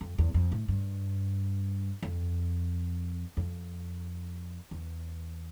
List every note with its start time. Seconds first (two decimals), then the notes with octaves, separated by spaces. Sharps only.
0.01 F2
0.18 E2
0.34 F2
0.52 A2
0.68 G2
2.03 F2
3.37 F2
4.71 E2